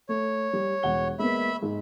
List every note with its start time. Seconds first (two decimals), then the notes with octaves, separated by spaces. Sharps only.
0.09 A3 C#5
0.53 G3
0.83 E1 F#5 G7
1.19 G#3 A#3 B3 E5 B5
1.62 G#2